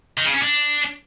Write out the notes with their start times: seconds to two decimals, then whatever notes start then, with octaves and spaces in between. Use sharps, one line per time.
0.18 D#3
0.26 C#3
0.34 C#4
0.42 D4